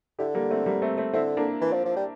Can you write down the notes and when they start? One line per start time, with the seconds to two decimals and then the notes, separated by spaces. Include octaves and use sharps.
0.19 D3 E4 G4
0.35 G3 A#3
0.50 A3 C4
0.66 G3 A#3
0.82 A3 C4
0.98 A3 C4
1.14 D3 C4 E4
1.37 A#3 D4
1.61 E3
1.73 F3
1.85 F3
1.96 G3